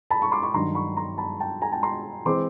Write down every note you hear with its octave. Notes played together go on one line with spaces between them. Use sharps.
A5 B5
B5 C#6
C6 D6
B5 C#6
G2 D#3 F#3 A#5 C6
B5 C#6
A#5 C6
A5 B5
G5 A5
G#5 A#5
G5 A5
A#5 C6
E3 G#3 C4 C6 D6